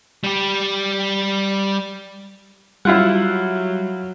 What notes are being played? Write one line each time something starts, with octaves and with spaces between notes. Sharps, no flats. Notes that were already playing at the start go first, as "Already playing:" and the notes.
G3 G4
F#3 G3 E4 F4 F#5